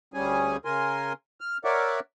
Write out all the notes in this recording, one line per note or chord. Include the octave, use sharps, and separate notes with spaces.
D2 G3 C#4 G#4 G#5
C#3 A#4 G#5 C6
F6
A#4 C#5 D5 E5 F#5 D6